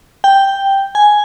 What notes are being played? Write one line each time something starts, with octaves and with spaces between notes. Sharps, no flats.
G5
G#5